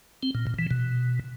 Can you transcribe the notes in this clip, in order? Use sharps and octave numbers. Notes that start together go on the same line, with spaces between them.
C4
A#2
A#2
E3
B2